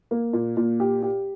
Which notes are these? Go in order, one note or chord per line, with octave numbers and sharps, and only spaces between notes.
A#3
A#2
A#2
G4
G4